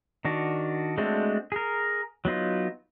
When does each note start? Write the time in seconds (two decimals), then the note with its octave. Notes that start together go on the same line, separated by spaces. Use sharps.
0.25 D#3 D4 F#4
0.97 G#3 A3 C4 D4 F#4
1.52 G#4 A#4
2.25 F#3 B3 D#4 F4